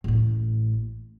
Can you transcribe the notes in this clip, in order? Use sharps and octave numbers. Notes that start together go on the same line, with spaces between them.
A1 A2